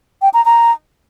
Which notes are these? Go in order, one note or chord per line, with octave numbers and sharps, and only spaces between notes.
G5
A#5
A#5